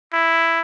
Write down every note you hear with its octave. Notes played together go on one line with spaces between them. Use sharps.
E4